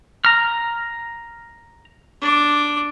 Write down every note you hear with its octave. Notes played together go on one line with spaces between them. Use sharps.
A#5 F6
D4 D6